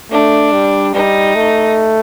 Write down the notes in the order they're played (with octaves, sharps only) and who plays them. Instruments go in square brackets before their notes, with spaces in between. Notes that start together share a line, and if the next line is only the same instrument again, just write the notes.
[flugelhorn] A3 [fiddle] D4
[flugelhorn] G3
[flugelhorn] G3 [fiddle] D#4
[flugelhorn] A3